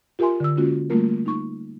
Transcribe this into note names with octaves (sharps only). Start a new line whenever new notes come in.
F4 G4 A#4 E5 G#5 C6
D3 E6
G#3 A#3 C#4 F4 F#4
G3 A3 A#3 F4 A#4
D#4 C#6